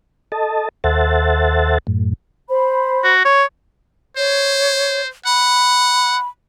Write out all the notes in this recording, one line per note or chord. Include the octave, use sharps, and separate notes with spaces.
A4 D#5 A5
D#2 A4 C5 E5 F#5 A6
F#2 A2
C5 B5
F#4
C#5
C5 C#5
F#5 B5